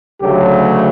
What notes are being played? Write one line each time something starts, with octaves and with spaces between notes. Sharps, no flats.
D2 C#3 F#3 A3 G4